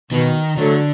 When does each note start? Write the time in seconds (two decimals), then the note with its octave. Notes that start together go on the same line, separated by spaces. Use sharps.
0.12 B2 D#3
0.57 D3 F#3 A3